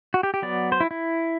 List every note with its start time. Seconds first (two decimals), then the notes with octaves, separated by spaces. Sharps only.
0.14 F#4
0.23 G4
0.34 G4
0.42 F#3 B3 D5
0.72 C5
0.80 E4
0.91 E4